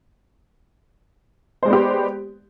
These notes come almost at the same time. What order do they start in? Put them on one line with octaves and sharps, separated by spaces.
C5 G#3 D5 B3 G4